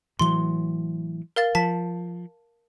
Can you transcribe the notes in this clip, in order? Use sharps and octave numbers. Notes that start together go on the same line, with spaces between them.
A2 E3 F#3 C6 G7
A#4 F5 A6
F3 A5 B6